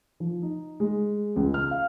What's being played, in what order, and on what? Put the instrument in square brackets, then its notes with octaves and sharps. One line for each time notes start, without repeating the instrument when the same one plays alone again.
[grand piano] F3
D#4
G#3
C#2
F6
F5